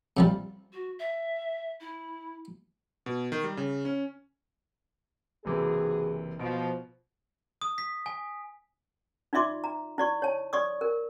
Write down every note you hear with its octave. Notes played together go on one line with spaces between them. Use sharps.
C3 F3 G3
F#4
E5
E4
B2
D#3
G3
C#3
C#4
F#1 C3 E3 F#4 G#4
B2 F3 D7
D#6
B6
G#5
D#4 F4 D5 E5 C6 D6
A#5
E4 D5 C#6
C#5 A5
D5 C#6 D#6
A#4